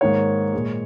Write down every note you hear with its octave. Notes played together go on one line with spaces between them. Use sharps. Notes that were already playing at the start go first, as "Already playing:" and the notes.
G#2 D#3 A#3 C#5
A#2 G#3